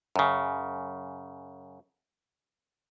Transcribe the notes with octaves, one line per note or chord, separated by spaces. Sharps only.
F#2 C#3